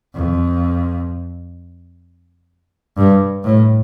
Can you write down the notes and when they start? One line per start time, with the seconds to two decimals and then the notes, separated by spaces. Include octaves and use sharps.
0.14 F2
2.97 G2
3.44 A2